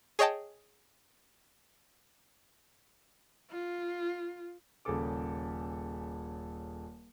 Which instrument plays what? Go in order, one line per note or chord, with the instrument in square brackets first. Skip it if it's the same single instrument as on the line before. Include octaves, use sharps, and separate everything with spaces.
[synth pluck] G#4 C#5 D#5 G5 A5
[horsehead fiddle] F4
[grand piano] D#1 C#3 G#4 A4 D6